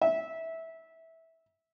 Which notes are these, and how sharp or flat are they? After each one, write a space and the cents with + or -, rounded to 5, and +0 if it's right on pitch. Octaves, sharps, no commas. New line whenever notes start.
E5 -15